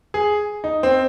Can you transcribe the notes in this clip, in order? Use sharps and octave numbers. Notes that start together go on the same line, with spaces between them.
G#4
D#4
C4